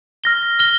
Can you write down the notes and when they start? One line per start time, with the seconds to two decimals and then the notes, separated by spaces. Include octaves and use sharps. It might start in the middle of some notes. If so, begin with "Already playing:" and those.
0.24 F6 A#6 G7
0.59 F6 A#6 G7